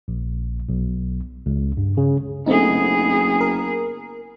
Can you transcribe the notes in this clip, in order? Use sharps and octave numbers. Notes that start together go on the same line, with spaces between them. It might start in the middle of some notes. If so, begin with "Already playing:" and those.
A#1
B1
C#2
G2
C#3
F#1 A3 B3 C4 D#4 G#4
A#4